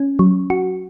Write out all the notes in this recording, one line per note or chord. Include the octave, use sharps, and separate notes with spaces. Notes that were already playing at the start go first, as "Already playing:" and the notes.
Already playing: C#4
F#3
F#4